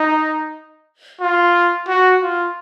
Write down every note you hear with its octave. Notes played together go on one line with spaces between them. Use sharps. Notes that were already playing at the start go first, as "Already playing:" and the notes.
Already playing: D#4
F4
F#4
F4